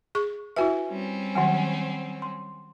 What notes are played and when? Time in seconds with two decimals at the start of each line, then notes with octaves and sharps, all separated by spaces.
0.15 G#4 C#6
0.56 E4 F#4 B4 E5 G#5
0.90 G3 C4 C#4
1.35 D#3 F#3 F#4 F#5 G#5
2.22 C6